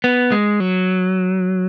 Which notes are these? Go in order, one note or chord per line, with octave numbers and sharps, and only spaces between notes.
B3
G#3
F#3